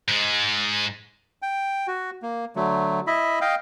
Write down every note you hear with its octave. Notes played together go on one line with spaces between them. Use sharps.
G#2 G#3
G5
F#4
A#3
D3 F#3 A3
E4 D#5 E5 B5
D#5 F5 G5